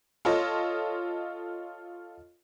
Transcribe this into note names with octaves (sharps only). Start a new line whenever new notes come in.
F4 A4 C#5 D#5